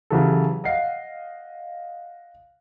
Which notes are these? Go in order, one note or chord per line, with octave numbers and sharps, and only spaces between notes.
C#3 E3 F#3 G4 A4
D#5 F5 F#5 C7